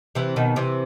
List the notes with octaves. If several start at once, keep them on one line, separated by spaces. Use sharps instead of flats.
C3 E3
B2 D#3
C3 E3